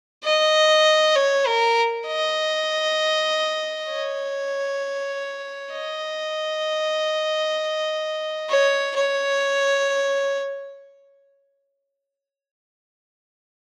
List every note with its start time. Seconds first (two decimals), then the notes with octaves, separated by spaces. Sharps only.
0.24 D#5
1.16 C#5
1.47 A#4
2.07 D#5
3.90 C#5
5.74 D#5
8.49 C#5
8.96 C#5